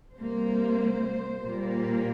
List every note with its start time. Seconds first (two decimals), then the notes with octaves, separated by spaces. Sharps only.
0.17 C3 G3 A#3 C5
1.43 A#2 G3 A#3